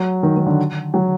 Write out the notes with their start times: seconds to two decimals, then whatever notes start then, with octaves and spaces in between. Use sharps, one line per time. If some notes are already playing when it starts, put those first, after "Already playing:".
Already playing: F#3
0.23 D#3
0.37 D#3
0.46 D3
0.94 F#3